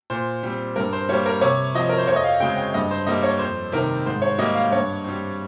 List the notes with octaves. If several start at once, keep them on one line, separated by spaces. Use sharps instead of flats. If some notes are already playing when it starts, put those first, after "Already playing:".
A#2 C5
G3 C4
G2 A#4
C5
G3 A#3 C#5
A#4
C3 C#5
F3 C4 D#5
A#4
C5
F2 C#5
D#5
F5
C#3 G#3 C4 G5
G5
G2 D#5
C5
G3 A#3 D#5
C#5
F2 C5
C3 D#3 A#4
G#2 C5
C#5
G3 A#3 D#5
F5
G2 C#5
G3 C4